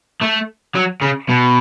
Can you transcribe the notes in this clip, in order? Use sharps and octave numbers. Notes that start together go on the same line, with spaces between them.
A3
F#3
C#3
B2